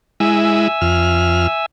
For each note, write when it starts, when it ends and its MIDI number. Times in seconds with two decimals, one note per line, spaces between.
0.20 0.68 56
0.20 0.68 64
0.20 1.66 76
0.20 1.66 80
0.20 1.66 88
0.81 1.47 41
0.81 1.47 89